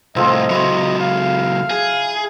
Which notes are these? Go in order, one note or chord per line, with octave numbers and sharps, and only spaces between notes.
C2 A2 C4 F4 A4 D#5
C#2 F#3 E4 C6 C#6
F5
G#4